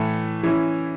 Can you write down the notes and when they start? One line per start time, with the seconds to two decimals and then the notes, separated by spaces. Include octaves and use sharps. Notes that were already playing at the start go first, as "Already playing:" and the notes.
Already playing: A2 E3 A3
0.43 E3 C#4 E4